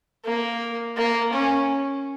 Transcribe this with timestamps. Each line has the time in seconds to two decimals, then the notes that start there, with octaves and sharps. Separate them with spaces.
0.25 A#3
0.97 A#3
1.33 C#4